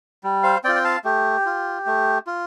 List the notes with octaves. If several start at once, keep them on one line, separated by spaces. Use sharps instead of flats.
G3
C5 F5
C4 F4 D5 G5
G5
F5 A5
A3 G4
F4
A3
F4